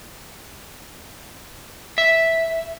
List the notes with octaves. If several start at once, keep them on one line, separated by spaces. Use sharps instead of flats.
E5